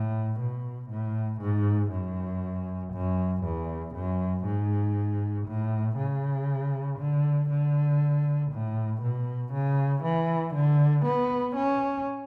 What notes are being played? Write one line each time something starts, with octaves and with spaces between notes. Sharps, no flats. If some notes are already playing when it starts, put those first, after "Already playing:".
Already playing: A2
B2
A2
G#2
F#2
F#2
E2
F#2
G#2
A2
C#3
D3
D3
A2
B2
C#3
E3
D3
B3
C#4